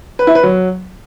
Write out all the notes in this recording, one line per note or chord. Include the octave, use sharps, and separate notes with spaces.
B4
E4
B4
F#3